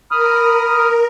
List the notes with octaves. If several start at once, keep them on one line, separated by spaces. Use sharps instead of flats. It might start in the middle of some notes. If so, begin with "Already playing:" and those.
A#4 B5 D#6 F6